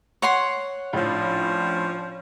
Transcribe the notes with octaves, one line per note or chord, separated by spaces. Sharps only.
C#5 F#5 C6
A#1 A2 F3 C#4 D4 F4